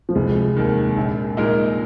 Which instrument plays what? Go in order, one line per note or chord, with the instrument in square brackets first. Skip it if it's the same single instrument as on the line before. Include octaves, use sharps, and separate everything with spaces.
[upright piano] F3
[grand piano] F1 [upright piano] G#3
[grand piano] D#2 D#3
A#1
A#2 G#3 D#4 A#4